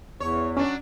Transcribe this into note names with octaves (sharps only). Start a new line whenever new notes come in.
E2 C#5
F#3 C#4 D4